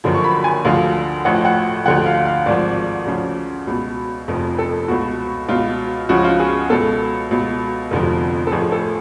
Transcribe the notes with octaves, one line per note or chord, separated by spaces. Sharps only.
F#1 F#2 D3 F3
C#6
B5
G#5
D2 D3 F3 F5
A1 A2 F3 F#5
F#5
D2 D3 F3 F#5
F5
F5
G#1 G#2 F3 D5
D2 C#3 F3
C#2 B2
F1 F2 F3
A4
C#2 B2 F#4
C#2 B2 F4
C#2 C#3 F3 F#4
F4
G#4
C#2 B2 A4
C#2 B2
F1 F2 D3 F3
A4
A1 A2 F3 G#4
A4